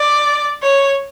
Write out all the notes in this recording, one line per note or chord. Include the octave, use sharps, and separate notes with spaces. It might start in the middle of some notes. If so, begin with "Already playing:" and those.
Already playing: D5
C#5